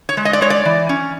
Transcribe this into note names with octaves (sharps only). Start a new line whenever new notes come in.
C#5
G#3
D#5
D5
G#3 C#5
D5
E3
C#4